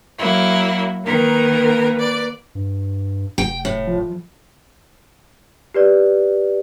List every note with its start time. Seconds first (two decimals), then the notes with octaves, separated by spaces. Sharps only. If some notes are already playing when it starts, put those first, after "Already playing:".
0.18 F#3 A#3 E4
1.04 D#3 A#3 A#4 B4
1.99 D5
2.55 G2
3.38 F1 G5
3.65 A2
3.88 F3
5.74 G4 B4 D5